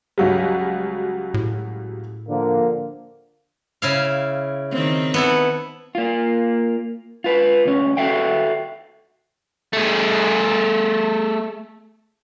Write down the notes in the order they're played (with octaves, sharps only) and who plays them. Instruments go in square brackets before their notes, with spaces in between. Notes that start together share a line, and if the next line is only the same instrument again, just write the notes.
[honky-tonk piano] C#2 F#3 G3
[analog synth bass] A2
[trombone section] D3 F3 A#3
[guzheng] C#3 E4 F5
[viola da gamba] D#3 C4
[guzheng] B3 E4 A4
[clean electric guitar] A#3 F4
F4 B4
D2 C#4
F#4 A4 E5 F5 G5
[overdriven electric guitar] A3 G#4